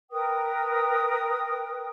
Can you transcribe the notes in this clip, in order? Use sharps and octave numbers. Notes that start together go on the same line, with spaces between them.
A#4 B4 G5 D#6